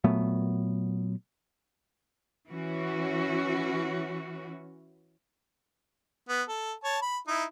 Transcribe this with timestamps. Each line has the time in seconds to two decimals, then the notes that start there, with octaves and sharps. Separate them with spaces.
0.04 A#2 F#3 A3 B3
2.49 E3 C#4 F#4
6.29 B3
6.48 A4
6.84 C#5 A5
7.02 B5
7.27 D#4 E4